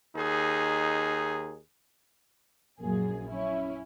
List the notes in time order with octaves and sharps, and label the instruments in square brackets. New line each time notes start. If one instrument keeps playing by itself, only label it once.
[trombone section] D#2 D#4 G#4
[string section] A#1 F#2 A#3 G#4
C#4 E4